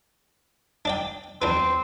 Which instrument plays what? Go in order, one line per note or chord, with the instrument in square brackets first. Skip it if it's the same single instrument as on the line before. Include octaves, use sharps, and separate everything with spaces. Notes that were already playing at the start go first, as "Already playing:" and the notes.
[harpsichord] D4 D5 G5
[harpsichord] E2 D4 B4 [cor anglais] C4